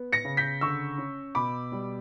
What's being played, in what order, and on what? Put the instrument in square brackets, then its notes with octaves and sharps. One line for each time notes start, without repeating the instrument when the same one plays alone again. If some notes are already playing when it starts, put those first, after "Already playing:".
Already playing: [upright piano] B3
A#6 C#7
C#3
G6 B6
D3 C#6 E6
C#4
B2 B5 D6
G3